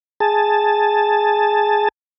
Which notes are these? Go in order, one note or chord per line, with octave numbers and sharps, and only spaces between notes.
G#4 A5